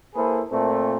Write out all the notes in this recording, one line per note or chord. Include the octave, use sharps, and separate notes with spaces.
A#3 E4 G#4 A4 B4 C5
A#2 A3 C4